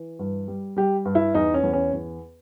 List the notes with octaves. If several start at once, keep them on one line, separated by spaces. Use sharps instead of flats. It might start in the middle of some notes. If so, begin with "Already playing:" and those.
Already playing: E3
G2
G3
G3 G4
G2
E4
E2 D#4
C#4
E2
C#4
E2